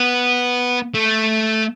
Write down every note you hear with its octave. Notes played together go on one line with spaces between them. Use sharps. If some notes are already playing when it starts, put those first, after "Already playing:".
Already playing: B3
A3